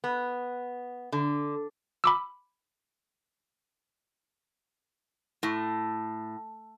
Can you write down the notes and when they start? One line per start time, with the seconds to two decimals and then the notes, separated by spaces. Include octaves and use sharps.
0.04 B3
1.12 D3
2.04 B5 D6 E6
5.43 A2